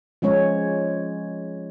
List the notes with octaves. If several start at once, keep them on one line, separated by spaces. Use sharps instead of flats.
F3 G#3 C#4 C#5